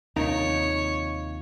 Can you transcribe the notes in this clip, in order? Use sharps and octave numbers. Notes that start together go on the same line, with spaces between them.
D#2 C3 D#4 F4 A#4 C#5